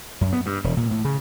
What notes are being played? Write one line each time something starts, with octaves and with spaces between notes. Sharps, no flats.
F#2
B3
G2
E1
A#2
A2
C#3